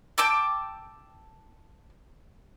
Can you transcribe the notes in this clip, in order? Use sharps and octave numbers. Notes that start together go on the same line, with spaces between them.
G5 A5 D6 E6